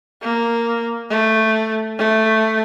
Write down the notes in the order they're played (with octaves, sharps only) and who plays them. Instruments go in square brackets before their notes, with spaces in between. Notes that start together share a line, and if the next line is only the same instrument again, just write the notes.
[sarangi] A#3
A3
A3